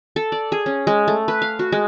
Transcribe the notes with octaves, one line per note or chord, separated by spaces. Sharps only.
A4
D5
G#4
C#4
G#3
A3
B4
F5
F#4
G#3